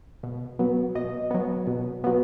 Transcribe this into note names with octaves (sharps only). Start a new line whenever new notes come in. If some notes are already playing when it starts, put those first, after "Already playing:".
B2
F#3 B3
B2 D#5
F#3 B3
B2
F#3 B3